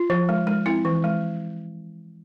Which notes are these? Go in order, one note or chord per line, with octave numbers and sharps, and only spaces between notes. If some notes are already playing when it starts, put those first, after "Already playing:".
Already playing: F4
F3
G#3
G#3
C4 E4
E3
G#3